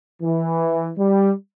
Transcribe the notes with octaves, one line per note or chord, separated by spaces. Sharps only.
E3
G3